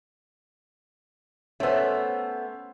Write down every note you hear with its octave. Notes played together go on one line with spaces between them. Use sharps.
A3 B3 C#4 C5 E6